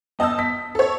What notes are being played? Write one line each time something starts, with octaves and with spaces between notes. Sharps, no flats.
G1 D#5 A5 D#6 E6
B6
A4 C#5